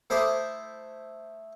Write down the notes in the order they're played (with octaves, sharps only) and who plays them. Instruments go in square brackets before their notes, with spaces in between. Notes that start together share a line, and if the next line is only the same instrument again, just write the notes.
[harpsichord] A3 E4 C5 A5 D6 D#6